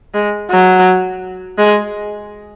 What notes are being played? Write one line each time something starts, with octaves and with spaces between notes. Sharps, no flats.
G#3
F#3
G#3